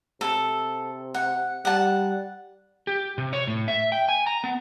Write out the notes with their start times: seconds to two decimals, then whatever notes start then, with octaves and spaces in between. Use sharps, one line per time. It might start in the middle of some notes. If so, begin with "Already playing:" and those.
0.21 C3 A4
1.14 F#5
1.65 G3 F#5 A5
2.87 G4
3.18 C3
3.33 C#5
3.47 A2
3.68 E5
3.92 G5
4.09 G#5
4.27 A#5
4.44 B3